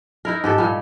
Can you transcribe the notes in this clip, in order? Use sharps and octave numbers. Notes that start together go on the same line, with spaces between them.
D#4 E4 A#4
G#2 G4 A4
A#2 G3